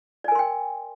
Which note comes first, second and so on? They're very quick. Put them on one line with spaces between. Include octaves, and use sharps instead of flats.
D5 G#5 A#4 C6 G5